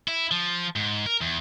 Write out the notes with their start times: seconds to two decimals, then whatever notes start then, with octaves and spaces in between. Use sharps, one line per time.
0.08 E4
0.31 F3
0.76 G#2
1.06 A#4
1.21 E2